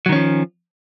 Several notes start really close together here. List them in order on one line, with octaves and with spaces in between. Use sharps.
F#3 D#3 C#4 F3